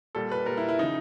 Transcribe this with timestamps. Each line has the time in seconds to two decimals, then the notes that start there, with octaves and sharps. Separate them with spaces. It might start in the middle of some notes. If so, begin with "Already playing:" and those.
0.15 A#2 G3 A4
0.32 B4
0.46 A#2 G3 A#4
0.57 E4
0.69 E4
0.79 C#3 F3 D#4